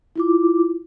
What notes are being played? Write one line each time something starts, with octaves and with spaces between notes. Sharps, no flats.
E4 F4 D6